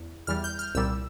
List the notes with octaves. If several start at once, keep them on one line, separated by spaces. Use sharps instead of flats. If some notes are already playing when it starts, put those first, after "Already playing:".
Already playing: E2
E2 E3 G3 F6
G6
F6
C2 A#2 G3 E6